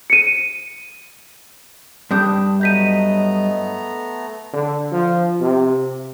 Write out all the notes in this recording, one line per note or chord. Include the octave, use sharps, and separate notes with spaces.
C#7 D#7
G2 D4 G5 D#6 G6
F#3 A3 B3 D#5 A#5 G6 B6 D#7
D3
F3
C3